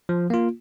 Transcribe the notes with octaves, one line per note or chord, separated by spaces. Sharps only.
F3
A#3 F4